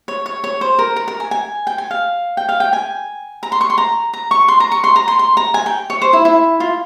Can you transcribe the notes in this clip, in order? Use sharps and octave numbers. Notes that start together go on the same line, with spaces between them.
C#5
C#5
C#5
C5
A#4
A#4
A#4
G#5
G#5
G5
G#5
F5
G5
F5
G5
G#5
A#5
C6
C#6
C6
A#5
A#5
C#6
C6
A#5
C#6
C6
A#5
C6
C6
A#5
G#5
G5
C#5
C5
E4
E4
F4